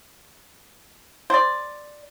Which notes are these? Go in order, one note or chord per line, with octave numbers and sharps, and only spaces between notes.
C5 D5